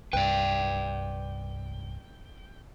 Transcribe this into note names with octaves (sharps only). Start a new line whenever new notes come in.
C2 G2 B4 D5 G5